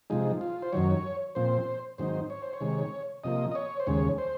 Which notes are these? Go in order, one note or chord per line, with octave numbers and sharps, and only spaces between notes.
C3 F3 G#3 D#4
F4
C5
F#2 D#3 F#3 C#5
A#2 F3 C4 C5
G#2 D#3 F#3 C4 D#4 C5
C#5
C5
C#5
C3 D#3 G#3
C3 F3 A#3 D#5
D#5
C#5
C5
D#2 C#3 G#3 C#5
C5